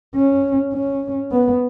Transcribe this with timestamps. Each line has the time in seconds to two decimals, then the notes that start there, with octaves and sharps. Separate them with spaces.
0.16 C#4
0.73 C#4
1.32 B3